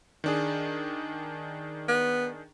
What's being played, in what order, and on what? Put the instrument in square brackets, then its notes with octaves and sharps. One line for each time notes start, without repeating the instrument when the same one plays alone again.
[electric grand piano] D#3 D4 G#4
[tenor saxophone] B3